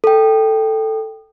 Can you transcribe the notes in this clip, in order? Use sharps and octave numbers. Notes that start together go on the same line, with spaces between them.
A4 G5